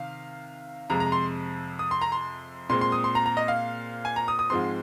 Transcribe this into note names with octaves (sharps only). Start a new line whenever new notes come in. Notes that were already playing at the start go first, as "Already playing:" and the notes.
Already playing: C3 D#3 F5
F2 C3 G#3 A#5
A#5
C6
D#6
C6
A#5
C6
A#2 G#3 C4 C6
C6
D#6
C6
A#5
A#5
D#5
F5
G#5
A#5
D#6
D#6
G#2 F3 G#3 C4 C6